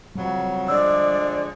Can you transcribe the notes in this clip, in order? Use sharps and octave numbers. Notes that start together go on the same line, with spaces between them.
F2 C#3 F#3 G3
D3 F3 G#3 D5 E6